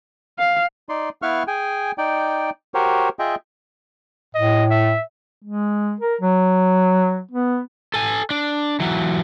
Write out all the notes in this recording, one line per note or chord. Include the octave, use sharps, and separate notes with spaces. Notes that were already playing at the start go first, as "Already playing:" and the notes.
F5
D#4 D5 C6
B3 E4 B4 F5 C#6 F6
G#4 G5 G#5
D#4 D5 G5
F#4 G4 A#4 C5 C#5
F4 G#4 D#5 E5 G5
A2 D#5
E5
G#3
A#4
F#3
B3
A4 G#5
D4
E3 F#3